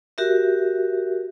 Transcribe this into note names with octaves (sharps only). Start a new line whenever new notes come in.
F#4 G4 A#4 E5